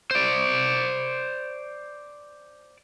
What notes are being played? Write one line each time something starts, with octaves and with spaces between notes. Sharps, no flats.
C5 D5